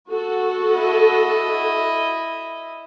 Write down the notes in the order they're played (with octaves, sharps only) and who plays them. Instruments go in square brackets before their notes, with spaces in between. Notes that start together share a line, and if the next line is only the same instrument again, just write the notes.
[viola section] F#4 A4
[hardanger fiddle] E4 D#5